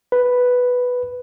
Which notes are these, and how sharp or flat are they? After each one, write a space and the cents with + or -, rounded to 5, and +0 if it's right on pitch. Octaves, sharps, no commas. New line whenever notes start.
B4 +0